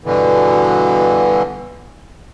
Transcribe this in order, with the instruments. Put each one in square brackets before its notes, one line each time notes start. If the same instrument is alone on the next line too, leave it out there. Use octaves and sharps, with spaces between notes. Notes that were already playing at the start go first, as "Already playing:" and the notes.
[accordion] G2 B2 D3 E3